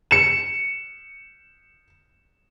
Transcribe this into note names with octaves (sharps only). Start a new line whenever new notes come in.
C#7 E7